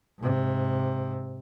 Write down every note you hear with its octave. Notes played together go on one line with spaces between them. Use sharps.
G#2 C3